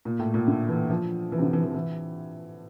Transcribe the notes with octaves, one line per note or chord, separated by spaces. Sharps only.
A#2
A2
A#2
D3
E3
F3
E3
C3
D3
E3
E3
E3